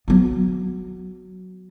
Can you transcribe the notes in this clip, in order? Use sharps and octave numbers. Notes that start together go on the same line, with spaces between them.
F#3 B3